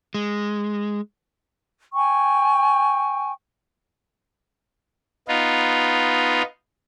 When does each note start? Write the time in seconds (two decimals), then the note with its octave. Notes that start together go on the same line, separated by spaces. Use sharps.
0.14 G#3
1.93 G5 G#5 C#6
5.28 B3 D#4 F4